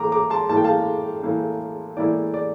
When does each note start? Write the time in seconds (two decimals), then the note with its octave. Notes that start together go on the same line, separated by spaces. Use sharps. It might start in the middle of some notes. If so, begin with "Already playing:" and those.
Already playing: A2 E3 A#3 E4 A#5 D6
0.12 A#5 D6
0.30 A5 C6
0.49 A2 E3 A#3 E4 A5
0.57 G5
0.64 F5 A5
1.23 A2 E3 A#3 E4
1.97 A2 E3 A#3 E4 D5
2.34 D5